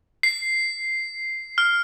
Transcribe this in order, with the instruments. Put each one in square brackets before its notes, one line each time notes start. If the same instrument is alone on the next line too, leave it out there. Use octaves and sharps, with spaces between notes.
[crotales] C7
F6